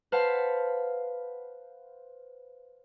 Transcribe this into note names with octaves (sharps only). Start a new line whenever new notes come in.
B4 C5 F5 F#5 A5